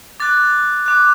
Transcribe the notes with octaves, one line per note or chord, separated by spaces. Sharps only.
D6 F#6 A6
D6 F#6